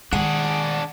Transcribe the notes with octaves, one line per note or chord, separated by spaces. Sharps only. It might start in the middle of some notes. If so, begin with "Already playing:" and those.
D#3 G#3 D4 G#4 F#5